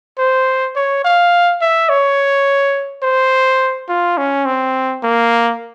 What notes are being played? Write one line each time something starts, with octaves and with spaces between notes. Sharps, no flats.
C5
C#5
F5
E5
C#5
C5
F4
C#4
C4
A#3